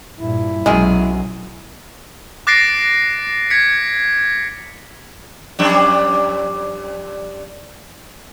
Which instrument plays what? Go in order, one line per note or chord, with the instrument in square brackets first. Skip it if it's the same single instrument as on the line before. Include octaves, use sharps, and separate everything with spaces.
[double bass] G2 A#2 [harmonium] E4
[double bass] B1 F#3 [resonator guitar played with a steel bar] F#2 C3 G#4 [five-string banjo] G#3
[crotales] D6 F#6 A6 A#6 C7 D7
G#6 B6 C#7
[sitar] F2 G3 D4